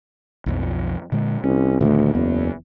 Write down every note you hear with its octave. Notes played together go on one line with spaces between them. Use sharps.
B1 F2 F3
A#2 D3 G#3
C2 C#4
D2 A#2 D#3 A3
F#1 E2 B3